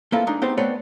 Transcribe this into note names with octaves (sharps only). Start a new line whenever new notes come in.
A#3 C4 E4 F4 A4 B4
G#3 D4 D#4
B3 C4 D#4 G4 G#4 C5
A3 B3 C4 B4 C#5 D5